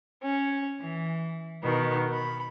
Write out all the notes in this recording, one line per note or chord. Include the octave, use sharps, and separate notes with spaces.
C#4
E3
B2 D#3 B3
B5